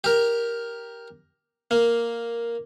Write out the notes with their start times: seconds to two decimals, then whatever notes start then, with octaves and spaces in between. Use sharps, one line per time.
0.04 G4 A#4
1.71 A#3